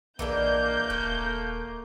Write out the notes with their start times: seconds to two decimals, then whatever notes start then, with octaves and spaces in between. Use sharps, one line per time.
0.19 A#1 E3 G#3 A#3 D4 G6
0.90 D#1 A3